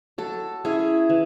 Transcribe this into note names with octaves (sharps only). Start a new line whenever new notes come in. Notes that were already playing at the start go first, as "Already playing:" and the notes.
F#3 A4
C#4 E4 G#4
E3